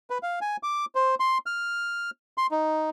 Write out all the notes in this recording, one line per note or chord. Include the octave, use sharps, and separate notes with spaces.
B4
F5
G#5
D6
C5
C6
F6
C6
D#4